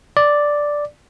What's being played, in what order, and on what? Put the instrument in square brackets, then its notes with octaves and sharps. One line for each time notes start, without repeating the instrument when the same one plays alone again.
[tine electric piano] D5